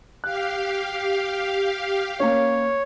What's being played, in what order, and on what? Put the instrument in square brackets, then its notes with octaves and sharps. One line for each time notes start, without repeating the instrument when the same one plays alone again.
[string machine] G4 F5 [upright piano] F#6
[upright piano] A#3 C#4 [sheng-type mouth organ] C#5